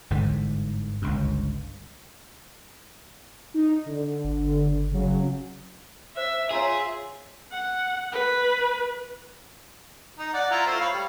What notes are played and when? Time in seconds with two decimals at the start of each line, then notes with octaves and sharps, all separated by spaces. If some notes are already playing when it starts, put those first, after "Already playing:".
0.10 G1 G#2 D3 E3
1.02 G1 C#2 G2
3.54 D#4
3.86 D3
4.24 G1
4.91 C#3 F#3
6.17 C5 E5
6.51 F4 G#4 C#5 E5 A#5 C#6
7.52 F#5
8.13 B4
10.19 D#4
10.34 D5 F#5
10.51 E4 F4 A#5
10.67 A3 F4 C5
10.80 C#5 F5 B5
10.93 G3